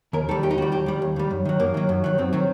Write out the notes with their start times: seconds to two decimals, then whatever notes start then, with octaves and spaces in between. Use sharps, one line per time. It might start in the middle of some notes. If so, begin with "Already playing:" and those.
0.13 D#2 A#4
0.29 D#3 G3 A4
0.43 D#2 G4
0.51 D#4
0.58 D#3 G3 F#4
0.72 D#2 G4
0.86 D#3 G3
1.02 D#2
1.16 D#3 G3
1.30 F#2
1.45 D#3 F#3
1.60 F#2 A#3
1.74 D#3 F#3
1.89 F#2
2.04 D#3 F#3
2.18 F#2 C4
2.33 D#3 F#3